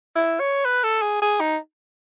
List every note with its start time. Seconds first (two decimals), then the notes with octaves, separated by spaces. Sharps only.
0.16 E4
0.40 C#5
0.65 B4
0.84 A4
1.02 G#4
1.22 G#4
1.40 D#4